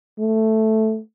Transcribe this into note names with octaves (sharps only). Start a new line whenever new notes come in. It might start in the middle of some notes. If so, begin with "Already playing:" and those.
A3